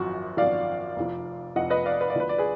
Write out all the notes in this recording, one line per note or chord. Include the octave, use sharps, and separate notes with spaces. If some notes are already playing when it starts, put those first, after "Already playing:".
Already playing: G#1 F#2 F3 F#4
G#1 F#2 F3 D5 F5
F1 F2 F3
F1 F2 F3 D#5 F#5
B4 D#5
D5 F5
B4
D5
D2 D3 F3 B4
D5
G#4 B4